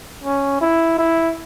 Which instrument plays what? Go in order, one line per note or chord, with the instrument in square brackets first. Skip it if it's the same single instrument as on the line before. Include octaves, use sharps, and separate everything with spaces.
[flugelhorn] C#4
E4
E4